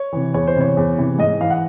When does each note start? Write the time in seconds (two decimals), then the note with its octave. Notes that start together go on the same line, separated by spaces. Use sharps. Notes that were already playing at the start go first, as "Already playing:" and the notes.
Already playing: C#5
0.13 C3 E3
0.34 E2 C#5
0.47 C5
0.56 C3 E3 C#5
0.77 E2
0.98 C3 E3
1.19 G#2 D#5
1.41 E3 F5
1.50 F#5